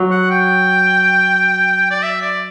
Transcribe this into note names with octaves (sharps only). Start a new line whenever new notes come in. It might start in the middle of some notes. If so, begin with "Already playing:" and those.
Already playing: F#3
F#5
G5
D5
E5
D5